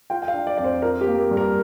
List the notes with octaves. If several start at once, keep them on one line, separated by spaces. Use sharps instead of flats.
F4 G5
G5
F5
D4
D5
F2 D5
C5
F4 A#4
G4
A#3
A#4
G2
A#4